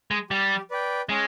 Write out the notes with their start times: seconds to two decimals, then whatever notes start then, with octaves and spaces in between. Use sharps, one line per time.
0.11 G#3
0.30 G3 G4
0.71 B4 D5 G5
1.09 G#3 C#4